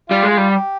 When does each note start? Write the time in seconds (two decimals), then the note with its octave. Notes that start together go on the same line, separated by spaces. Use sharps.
0.10 G3 F4
0.23 G#3
0.30 F4
0.37 G3
0.50 G4